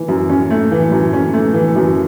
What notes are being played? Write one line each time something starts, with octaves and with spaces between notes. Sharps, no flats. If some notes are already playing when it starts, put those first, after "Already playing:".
Already playing: E3
F#2
C#4
A3
E3
F#2
C#4
A3
E3
F#2